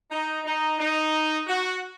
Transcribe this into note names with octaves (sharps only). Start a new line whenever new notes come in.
D#4
D#4
D#4
F#4